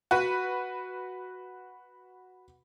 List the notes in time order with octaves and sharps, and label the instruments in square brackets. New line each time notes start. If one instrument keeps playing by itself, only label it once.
[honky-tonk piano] F#4 B4